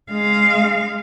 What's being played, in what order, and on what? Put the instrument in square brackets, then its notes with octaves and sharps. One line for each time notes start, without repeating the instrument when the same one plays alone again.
[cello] G#3 F5